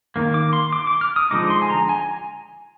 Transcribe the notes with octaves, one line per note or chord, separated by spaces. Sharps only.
D#3 A#3
D6
C6
D6
D6
F6
D#6
D3 F3 G#3 D#4 D6
C6
G#5
A#5
G#5